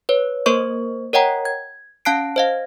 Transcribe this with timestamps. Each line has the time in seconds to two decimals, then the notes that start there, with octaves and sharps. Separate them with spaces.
0.09 B4 C#5
0.46 A#3 A#4 C5 D#5 C#6
1.13 A#4 C#5 D#5 F#5 G5 A#5
1.45 G#6
2.05 C#4 F5 A5 F#6 C7 D7
2.36 C5 D#5 F5